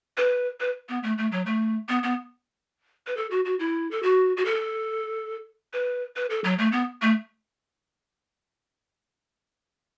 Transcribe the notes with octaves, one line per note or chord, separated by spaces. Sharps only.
B4
B4
B3
A3
A3
F#3
A3
B3
B3
B4
A4
F#4
F#4
E4
A4
F#4
F#4
A4
B4
B4
A4
F#3
A3
B3
A3